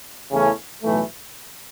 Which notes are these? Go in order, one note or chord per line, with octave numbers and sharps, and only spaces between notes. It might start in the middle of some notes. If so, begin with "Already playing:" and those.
E2 C#3 E3 A3 C#4
B1 A2 E3 A3